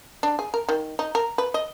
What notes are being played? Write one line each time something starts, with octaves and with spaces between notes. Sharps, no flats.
D4
G#4
A#4
D#3
D#4
A#4
B4
D#5